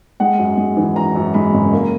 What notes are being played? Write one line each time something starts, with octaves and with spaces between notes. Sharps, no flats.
G#3 F#5
F#2
G#3
E3
F#2 A#5
F#2
G#3 B5
F#1
A#3